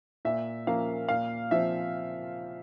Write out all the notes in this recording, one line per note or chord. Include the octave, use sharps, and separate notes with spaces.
A#2 E5
F3 A#3 C#4 F5
A#2 F5
F3 C4 E5